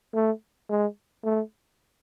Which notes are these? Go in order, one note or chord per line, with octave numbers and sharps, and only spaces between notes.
A3
G#3
A3